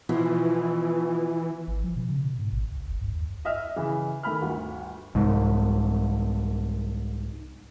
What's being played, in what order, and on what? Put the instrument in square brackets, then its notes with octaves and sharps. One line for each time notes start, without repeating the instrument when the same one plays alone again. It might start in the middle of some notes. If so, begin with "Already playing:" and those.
[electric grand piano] B2 E4 [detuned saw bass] E3 [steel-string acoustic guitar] F3
[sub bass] G#1
F3
B2
C#3
B2
G#2
A1
C#2
G1
G2
D#2
[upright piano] D#5 E5 F6
C#3 E3
D#3 A3 B5 F6
G1 D2
[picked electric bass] C2 G#2